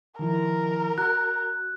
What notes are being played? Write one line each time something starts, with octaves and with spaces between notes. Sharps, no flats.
D#3 F3 E4 A#4
F#4 F#6